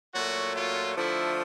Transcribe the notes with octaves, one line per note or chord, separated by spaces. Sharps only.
A#2 F#3 A3 F#4
F4
D3 F3 A3 E4